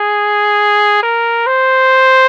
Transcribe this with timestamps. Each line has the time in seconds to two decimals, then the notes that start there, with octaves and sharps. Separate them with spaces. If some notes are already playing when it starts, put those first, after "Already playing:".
Already playing: G#4
1.03 A#4
1.47 C5